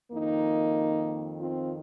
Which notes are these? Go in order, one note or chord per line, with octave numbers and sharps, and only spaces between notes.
F2 D#3 A#3 D#4
C4 F4